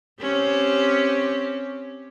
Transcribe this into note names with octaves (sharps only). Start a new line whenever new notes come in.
C4 C#4 G4